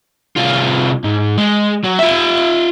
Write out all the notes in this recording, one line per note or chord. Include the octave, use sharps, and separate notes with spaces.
C2 F4
G#2
G#3
F#3
F4 E5